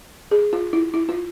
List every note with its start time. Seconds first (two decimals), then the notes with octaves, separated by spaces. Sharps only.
0.31 G#4
0.53 F4
0.73 E4
0.94 E4
1.09 F4